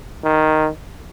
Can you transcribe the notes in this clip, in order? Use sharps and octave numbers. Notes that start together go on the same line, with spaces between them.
D#3